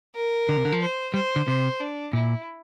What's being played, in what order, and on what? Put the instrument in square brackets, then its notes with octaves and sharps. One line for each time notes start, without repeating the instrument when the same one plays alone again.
[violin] A#4
[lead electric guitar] D3
C3
D3
F3
[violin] C5
[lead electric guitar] G3 [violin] C5
[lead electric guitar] D3
[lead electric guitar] C3 [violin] C5
[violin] D4
[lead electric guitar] A#2 [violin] E4